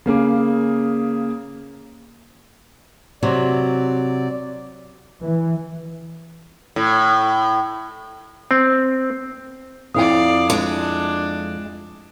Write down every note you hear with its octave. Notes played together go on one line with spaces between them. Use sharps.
C#3 A#3 G#4 D6
C3 F#3 F#4 D5
E3
A2
C4
F2 E4 D5 F5 G5 D#6
G#3 D4